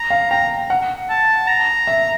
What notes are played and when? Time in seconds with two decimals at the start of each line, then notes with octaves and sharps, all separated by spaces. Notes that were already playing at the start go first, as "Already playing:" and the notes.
Already playing: A#5
0.10 F5
0.30 G5 A#5
0.70 F#5
1.09 A5
1.48 A#5
1.87 E5